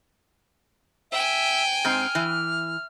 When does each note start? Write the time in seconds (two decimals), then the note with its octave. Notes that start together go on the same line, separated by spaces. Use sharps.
1.11 E5 G5 G#5
1.85 G#2 C4 F6
2.15 E3